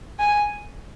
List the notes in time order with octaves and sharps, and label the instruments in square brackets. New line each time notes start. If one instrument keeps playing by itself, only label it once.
[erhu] G#5